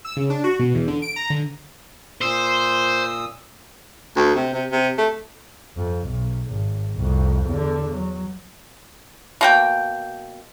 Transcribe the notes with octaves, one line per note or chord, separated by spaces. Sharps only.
E6
C#3
D4
F#4
B2
E2
D3
D7
A#5
D3
A#2 C5 D#6 E6
D2
C3
C3
C3
A3
F2
B1
G#1
C2 F2
E2 D3
F#3
B2 A#3 G5